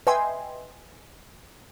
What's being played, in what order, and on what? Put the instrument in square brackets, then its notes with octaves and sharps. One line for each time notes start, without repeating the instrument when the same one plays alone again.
[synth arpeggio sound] B4 D#5 E5 G5 G#5 C6